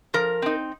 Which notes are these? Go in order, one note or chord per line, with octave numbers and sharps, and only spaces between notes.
F3 A#4
C4 D#4